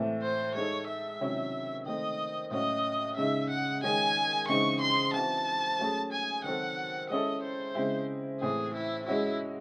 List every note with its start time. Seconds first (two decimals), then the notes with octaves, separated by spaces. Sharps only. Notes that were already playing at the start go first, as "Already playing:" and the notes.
Already playing: A2 E3 A3 C4 E4
0.22 C5
0.55 G#3 D#4 A4 C#5
0.88 E5
1.20 C3 D#3 F#3 C#4 E4
1.86 D#3 A3 C4 D#5
2.51 A2 F#3 C#4 F#4 D#5
3.17 C#3 G#3 D#4 E5
3.49 F#5
3.82 D#3 G#3 C#4 G#4 G#5
4.48 C#3 E3 G#3 C4 D#4 C#6
4.81 C6
5.13 E3 C4 F#4 A5
5.78 F#3 A3 C#4 G#4
6.12 G#5
6.44 D#3 F#3 C4 F#4 A4 F#5
7.10 G#3 C#4 E4 A4 D#5
7.43 C5
7.75 C#3 G#3 C4 E4
8.41 A2 E3 C4 G#4
8.74 E4
9.06 G#3 C#4 E4 F#4